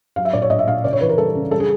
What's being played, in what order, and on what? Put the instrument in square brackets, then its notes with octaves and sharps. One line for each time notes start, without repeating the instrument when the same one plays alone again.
[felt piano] F#3 F5
E5
A#2 D5
C#5
A#2 D#5
E5
A#2 F5
C#3 D5
C#5
E3 B4
A#4
G3 A4
C#3
G3 A4
G#4